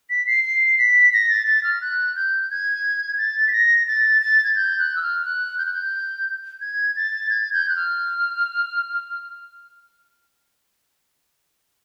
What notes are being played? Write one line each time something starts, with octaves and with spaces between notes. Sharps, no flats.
B6
C7
C7
B6
A#6
A6
A6
F6
F#6
G6
G#6
A6
B6
A#6
A6
A6
G#6
G6
F#6
E6
F6
F#6
G6
F#6
G6
G#6
A6
G#6
G6
F#6
F6